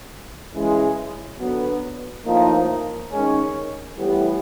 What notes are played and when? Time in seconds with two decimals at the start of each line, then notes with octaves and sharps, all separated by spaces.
0.54 C#3 E3 G#3
1.39 D3 F#3 B3
2.25 A2 F3 A#3 D#4
3.11 D#3 G#3 C#4
3.96 A2 E3 G3 B3